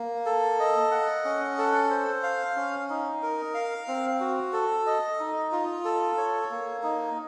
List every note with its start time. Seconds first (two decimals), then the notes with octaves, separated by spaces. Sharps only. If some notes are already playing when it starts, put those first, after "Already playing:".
Already playing: A#3
0.26 A4
0.60 D#5
0.91 F#5
1.25 C#4
1.58 A4
1.90 C5
2.23 F5
2.56 C#4
2.90 D#4
3.23 A#4
3.54 F5
3.88 C4
4.20 F#4
4.53 A4
4.86 D#5
5.20 D#4
5.52 F4
5.85 A4
6.18 C#5
6.51 A#3
6.83 D#4